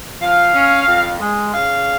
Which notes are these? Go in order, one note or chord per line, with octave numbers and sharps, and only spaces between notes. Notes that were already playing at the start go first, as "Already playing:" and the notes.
F3 F5
C#4
F2
G#3
C#3 F5